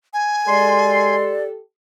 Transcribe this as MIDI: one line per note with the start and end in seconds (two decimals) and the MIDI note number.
0.13 1.15 80
0.47 1.33 56
0.47 1.60 67
0.47 1.60 69
0.47 1.44 74
0.47 1.33 84